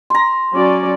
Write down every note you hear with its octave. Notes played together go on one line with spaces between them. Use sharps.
A#5 C6
F#3 C#4 D5